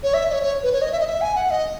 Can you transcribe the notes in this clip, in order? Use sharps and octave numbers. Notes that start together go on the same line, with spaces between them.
C#5
E5
D#5
C#5
C#5
B4
C#5
D#5
E5
D#5
E5
G#5
F#5
D#5